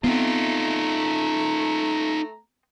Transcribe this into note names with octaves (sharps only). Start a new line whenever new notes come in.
A3 B3 C4 D#4 F4 A#5